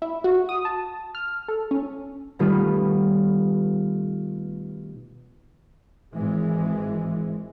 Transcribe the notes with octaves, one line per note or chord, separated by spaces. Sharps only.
E4
F#4
D#6
A5
F6
A4
C#4
B2 D#3 G3 A3 B3 F4
G#1 E3 G#3